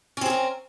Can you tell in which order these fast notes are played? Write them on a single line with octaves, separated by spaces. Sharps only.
C#4 C4 G#4 A#4